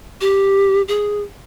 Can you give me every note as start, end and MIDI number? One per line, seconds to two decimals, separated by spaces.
0.21 0.82 67
0.88 1.22 68